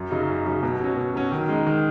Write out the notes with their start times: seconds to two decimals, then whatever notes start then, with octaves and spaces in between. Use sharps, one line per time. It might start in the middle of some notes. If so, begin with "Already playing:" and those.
Already playing: F#2
0.11 C#3 F#3 D#4
0.28 F#2
0.46 C#3 F#3 D#4
0.63 B2
0.80 F#3 C#4
0.97 B2
1.15 F#3 C#4
1.32 D#3
1.49 G#3 D#4
1.67 D#3